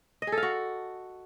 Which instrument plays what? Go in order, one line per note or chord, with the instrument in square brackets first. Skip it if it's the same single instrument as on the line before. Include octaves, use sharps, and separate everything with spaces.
[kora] D#5
G#4
A4
F5
F#4